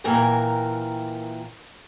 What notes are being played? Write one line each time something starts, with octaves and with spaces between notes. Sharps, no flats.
A#2 E3 A#4 G5 G#5 A#5